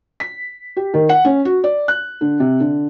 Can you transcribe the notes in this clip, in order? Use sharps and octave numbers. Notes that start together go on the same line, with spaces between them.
B6
G4
D#3
F#5
C#4
F#4
D5
F#6
D3
C3
D3